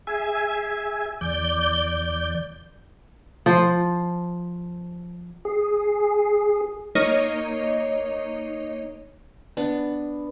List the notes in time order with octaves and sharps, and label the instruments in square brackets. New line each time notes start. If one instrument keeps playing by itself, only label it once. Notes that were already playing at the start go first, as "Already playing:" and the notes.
[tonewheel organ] G#4 E5 G#5
E2 D5 G6
[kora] F3 C5
[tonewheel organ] G#4
[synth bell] A#3 D#4 C#5 D#5
[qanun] B3 D4